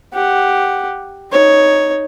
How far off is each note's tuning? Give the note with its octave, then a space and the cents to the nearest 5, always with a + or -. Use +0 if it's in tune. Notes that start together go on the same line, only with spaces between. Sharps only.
G4 +0 F#5 +0
D#4 +0 C#5 +0